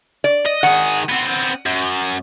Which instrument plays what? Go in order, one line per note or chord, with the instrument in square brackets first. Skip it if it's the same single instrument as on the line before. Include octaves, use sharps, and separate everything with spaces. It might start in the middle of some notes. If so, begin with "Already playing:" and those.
[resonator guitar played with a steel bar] D5
[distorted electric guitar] D#5
[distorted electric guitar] D#3 G#4 [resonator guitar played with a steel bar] F#5
[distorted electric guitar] B3 C4
F#2